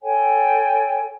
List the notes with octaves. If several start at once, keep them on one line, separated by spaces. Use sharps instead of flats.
A4 C#5 G5 G#5